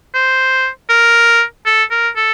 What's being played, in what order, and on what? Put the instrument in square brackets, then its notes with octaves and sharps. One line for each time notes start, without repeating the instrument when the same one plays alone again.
[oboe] C5
A#4
A4
A#4
A4